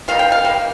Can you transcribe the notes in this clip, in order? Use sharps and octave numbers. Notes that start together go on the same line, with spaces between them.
G3 A#3 D#4 F5
G5
F5
G3 A#3